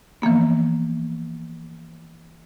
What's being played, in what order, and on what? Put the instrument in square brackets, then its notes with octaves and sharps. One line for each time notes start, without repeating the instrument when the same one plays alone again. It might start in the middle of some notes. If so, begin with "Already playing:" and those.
[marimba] E3 F3 A#3 B3